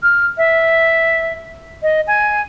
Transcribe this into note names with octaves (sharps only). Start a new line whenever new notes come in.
F6
E5
D#5
G#5